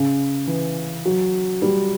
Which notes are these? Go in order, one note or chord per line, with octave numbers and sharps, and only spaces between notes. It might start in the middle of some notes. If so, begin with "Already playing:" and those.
Already playing: C#3
E3
F#3
G3